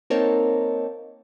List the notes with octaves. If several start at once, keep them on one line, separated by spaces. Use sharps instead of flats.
A#3 C4 D#4 A#4 C#5 A5